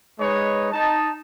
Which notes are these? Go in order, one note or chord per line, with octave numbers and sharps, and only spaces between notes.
G#3 D#4 B4 C#5
D#4 A5